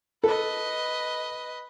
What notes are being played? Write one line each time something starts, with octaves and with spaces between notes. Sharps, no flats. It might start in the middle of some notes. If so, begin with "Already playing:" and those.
A4 B4 D#5